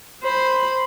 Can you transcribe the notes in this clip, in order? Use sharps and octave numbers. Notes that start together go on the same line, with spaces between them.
C5 B5